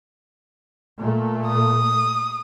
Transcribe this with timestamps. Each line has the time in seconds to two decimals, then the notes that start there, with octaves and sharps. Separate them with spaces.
0.98 A#2 A3
1.48 D#6